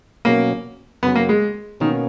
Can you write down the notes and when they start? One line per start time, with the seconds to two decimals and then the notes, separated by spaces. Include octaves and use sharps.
0.25 B2 F#3 A#3 C#4
1.03 F#2 C#3 F#3 B3
1.15 A#3
1.29 G#3
1.80 B2 D#3 A#3 C#4